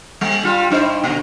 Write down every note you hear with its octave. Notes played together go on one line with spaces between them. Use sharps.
G3
G3 F4
G2 D#4 C5
A#2 D3